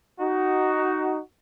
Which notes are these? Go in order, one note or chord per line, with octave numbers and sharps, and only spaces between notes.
D#4 F#4